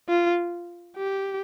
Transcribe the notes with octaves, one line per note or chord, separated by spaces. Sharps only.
F4
G4